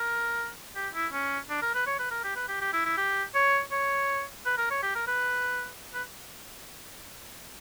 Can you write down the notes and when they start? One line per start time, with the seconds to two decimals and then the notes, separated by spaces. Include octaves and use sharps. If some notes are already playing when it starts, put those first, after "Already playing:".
Already playing: A#4
0.75 G4
0.94 E4
1.13 C#4
1.49 D4
1.62 A#4
1.74 B4
1.87 C#5
1.99 B4
2.11 A#4
2.24 G4
2.36 B4
2.48 G4
2.61 G4
2.73 E4
2.85 E4
2.97 G4
3.34 C#5
3.71 C#5
4.45 B4
4.58 A#4
4.70 C#5
4.82 G4
4.95 A#4
5.07 B4
5.94 B4